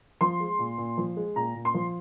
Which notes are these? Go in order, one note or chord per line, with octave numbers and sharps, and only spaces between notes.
F3 C6
G#3
A#2
A#2
F3
G#3
A#2 A#5
A#2
C6
F3